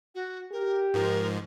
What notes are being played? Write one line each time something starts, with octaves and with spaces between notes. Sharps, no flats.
F#4
G4 A#4
G#2 F3 A#4